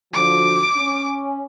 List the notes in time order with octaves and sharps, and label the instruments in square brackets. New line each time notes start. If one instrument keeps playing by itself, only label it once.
[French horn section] D3 F3 F#4 [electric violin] D6
[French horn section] C#4